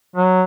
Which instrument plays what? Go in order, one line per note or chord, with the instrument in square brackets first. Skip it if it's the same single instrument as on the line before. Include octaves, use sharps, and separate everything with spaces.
[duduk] F#3